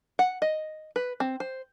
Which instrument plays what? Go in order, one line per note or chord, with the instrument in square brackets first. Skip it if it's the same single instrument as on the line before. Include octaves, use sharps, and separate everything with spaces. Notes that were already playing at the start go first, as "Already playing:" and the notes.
[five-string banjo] F#5
D#5
B4
C4
C5